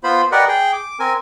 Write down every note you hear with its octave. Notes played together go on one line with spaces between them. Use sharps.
B3 F4 C5 B5
G4 A#4 B4 D5 D#5 F#5
G#4 G5
D6
C4 A#4 G#5